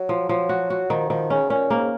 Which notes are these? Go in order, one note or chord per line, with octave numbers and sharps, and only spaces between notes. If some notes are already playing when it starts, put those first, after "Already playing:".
Already playing: F#3
F3
F3 F#3
F#4
F#4
D#3 F3
D#3 F3
C#3 C#4
A#2 C#4
G#2 A#3